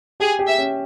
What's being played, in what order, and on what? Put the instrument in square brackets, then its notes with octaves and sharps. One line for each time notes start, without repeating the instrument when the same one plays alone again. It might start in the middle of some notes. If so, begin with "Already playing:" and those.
[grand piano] G4 [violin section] G#4
[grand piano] G4
[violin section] E5
[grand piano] C#4